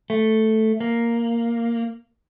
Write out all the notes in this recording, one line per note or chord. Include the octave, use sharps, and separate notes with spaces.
A3
A#3